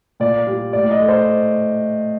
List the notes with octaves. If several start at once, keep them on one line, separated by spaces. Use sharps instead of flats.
A#2 D5
G3
A2 D5
D#5
A3
C5